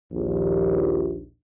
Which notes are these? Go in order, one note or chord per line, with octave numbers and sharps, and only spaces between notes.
A#1 D#2